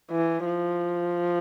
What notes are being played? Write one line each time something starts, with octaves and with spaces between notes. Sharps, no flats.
E3
F3